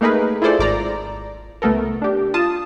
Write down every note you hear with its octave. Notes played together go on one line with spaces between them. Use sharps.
A3 A#3 D#4 G#4 A#4 B4
E4 F4 G#4 A4 C5 D5
G#1 D5 A#5
C#2 A3 B3 A4 A#4
D4 G4
F4 A5 D#6